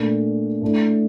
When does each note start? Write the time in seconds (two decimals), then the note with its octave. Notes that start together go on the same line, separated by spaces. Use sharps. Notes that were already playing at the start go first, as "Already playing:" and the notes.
Already playing: A#2 A3 D4
0.61 A2 A3 D4